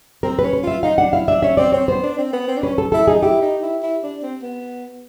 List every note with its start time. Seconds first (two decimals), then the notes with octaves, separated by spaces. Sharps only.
0.23 C4 A#4
0.39 B4
0.43 C#4
0.53 B4
0.63 F4 E5
0.83 D#4 F5
0.98 D4 F#5
1.13 E4 F5
1.27 D4 E5
1.43 C#4 E5
1.57 C4 D5
1.72 C4 C#5
1.88 B3 C5
2.03 D4
2.18 C4
2.33 B3
2.48 C4
2.57 D4
2.63 C#4 B4
2.78 A4
2.92 E4 A4
3.07 D#4 G#4
3.22 E4 G4
3.42 D#4
3.62 E4
3.82 E4
4.03 D4
4.23 C4
4.42 B3